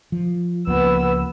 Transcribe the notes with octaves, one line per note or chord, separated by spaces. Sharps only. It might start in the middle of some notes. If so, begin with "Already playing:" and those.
F3
C#2 F3 A#3 B3 E6